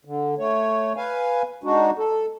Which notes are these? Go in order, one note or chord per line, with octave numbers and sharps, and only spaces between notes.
D3
A3 C#5
B4 F5 G#5
G#3 D4 D#4 F#4
A4